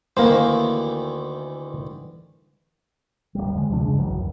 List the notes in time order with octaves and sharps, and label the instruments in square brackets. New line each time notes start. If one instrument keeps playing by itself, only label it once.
[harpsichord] D2 D#3 E3 [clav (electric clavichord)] A#3 C5
[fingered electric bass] D1 G1 G3
E2 D3 F3 G#3
D2 C3 F3 D4
G2 C#3 G#3
B1 E3 F#3
F#1 D#2